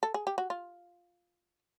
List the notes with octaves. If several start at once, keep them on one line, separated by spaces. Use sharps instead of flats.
A4
G#4
G4
F#4
F4